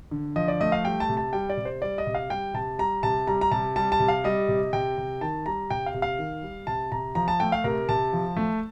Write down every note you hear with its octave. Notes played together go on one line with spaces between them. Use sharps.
D3
F3 D#5
D5
A3 D#5
F5
G3 G5
A5
C3
A5
G3 G5
D5
C3
C5
G3 D5
D#5
C3
F5
G3 G5
C3 A5
G3 A#5
C3 A5
G3 A#5
A#5
C3 A5
G3 A5
A5
C3
F5
G3 D#5
C3
C3 G5
C3
D#3 A5
G3 A#5
C3 G5
F5
C3
F5
D#3
G3
C3 A5
C3 A#5
F3 A#5
A5
A3 G5
F5
C3 A#4
C3 A5
F3
A3